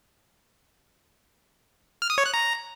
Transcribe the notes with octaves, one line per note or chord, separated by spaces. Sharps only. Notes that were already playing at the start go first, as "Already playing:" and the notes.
F6
D#6
C#5
F#6
A#5